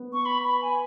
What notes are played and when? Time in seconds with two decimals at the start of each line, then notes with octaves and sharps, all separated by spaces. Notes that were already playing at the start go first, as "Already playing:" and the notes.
Already playing: B3
0.13 C#6
0.25 B5
0.44 B5
0.62 G#5